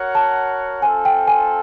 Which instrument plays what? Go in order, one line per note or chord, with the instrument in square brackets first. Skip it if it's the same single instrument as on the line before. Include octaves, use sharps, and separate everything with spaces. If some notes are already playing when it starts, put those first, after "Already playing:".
Already playing: [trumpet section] F#4 A#4 C#5 F#5
[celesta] A5
[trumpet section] C4 F4 A4 [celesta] G#5
[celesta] G5
G#5